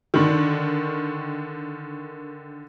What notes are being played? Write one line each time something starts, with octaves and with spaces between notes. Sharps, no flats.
D3 D#3